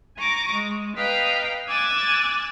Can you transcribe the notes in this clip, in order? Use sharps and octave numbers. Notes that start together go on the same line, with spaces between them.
G#5 A#5 C#6 D6 A#6
G#3
B4 D#5 F5 G5 A#5
G#5 D6 E6 F#6 G#6 A6